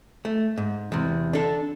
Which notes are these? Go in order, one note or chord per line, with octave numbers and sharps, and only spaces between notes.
A3
G#2
E2 C3
D4 A4